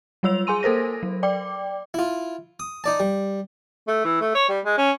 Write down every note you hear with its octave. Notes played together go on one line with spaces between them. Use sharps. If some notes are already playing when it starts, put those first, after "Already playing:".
F#3 G3 F4 C#5 E6 F7
G#4 G#5 C6 D#7
A#3 A4 A#4 C5 A#6
F#3
D5 G5 D6
E4 F4
D#6
D#4 D5 A5
G3
A3
E3
A3
C#5
G3
G#3
C#4